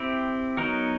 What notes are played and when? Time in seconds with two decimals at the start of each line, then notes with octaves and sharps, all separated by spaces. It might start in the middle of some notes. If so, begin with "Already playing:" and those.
Already playing: C4 E4 G4
0.57 F#3 B3 D#4 F#4 A#4